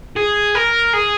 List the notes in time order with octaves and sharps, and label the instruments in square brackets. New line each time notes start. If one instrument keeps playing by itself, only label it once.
[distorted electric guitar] G#4
A#4
G#4